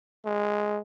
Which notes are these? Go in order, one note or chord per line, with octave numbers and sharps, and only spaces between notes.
G#3